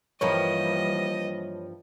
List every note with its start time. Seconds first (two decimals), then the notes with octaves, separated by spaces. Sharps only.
0.21 G2 E3 F3 G3 A#3 C#5 D#5